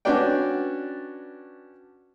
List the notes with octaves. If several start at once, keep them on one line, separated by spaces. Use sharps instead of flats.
C#4 D4 F#4 B4 D5 G5